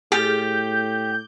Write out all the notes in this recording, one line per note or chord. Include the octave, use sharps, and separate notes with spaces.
A2 G4 G#4 F6 G6 A6